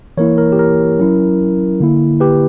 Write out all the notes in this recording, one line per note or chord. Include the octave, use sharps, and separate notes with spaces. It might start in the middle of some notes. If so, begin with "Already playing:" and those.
E3 A#3 E4 A#4 C#5
A#4
G4
A#4
F#3 C#4 E4
D3 A#3 E4
G4 B4